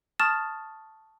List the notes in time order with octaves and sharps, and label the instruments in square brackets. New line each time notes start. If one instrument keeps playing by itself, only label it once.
[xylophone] A5 C#6 D#6 F6 A6 E7